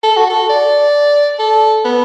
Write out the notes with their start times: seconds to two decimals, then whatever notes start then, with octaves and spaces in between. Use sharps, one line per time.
0.03 A4
0.17 F#4
0.30 A4
0.49 D5
1.39 A4
1.85 B3